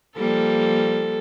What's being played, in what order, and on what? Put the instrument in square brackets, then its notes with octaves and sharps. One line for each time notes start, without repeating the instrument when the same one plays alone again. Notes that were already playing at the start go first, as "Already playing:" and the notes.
[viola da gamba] F3 G3 A#3 [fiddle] A4